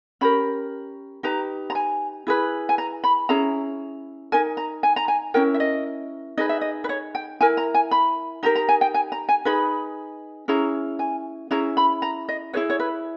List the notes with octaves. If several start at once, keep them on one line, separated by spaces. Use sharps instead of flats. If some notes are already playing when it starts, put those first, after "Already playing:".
C#4 G4 A#4 B5
D#4 G4 B4 A#5
A#5
G#5
E4 G#4 B4
G#5
A#5
B5
C#4 E4 G#4 A#5
D#4 A#4 G#5
A#5
G#5
A#5
G#5
C#4 E4 A#4 G5
E5
D#5
D#4 G#4 B4 D#5
E5
D#5
B4
C#5
G5
E4 A#4 G#5
A#5
G#5
B5
D#4 G4 A#4 A#5
A#5
G#5
G5
G#5
A#5
G#5
D#4 G#4 B4 B5
C#4 E4 G#4 A#5
G#5
C#4 E4 G#4 A#5
B5
A#5
D#5
E4 G#4 B4 C#5
C#5
B4